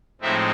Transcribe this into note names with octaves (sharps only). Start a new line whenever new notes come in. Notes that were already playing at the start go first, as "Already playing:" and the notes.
A2 F3 G#3 C4 D#4 E5